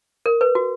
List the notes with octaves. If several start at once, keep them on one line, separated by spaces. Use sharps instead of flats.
A#4
B4
F#4